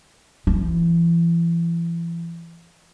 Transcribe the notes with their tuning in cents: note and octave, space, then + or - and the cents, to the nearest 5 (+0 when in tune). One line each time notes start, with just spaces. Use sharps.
E3 +35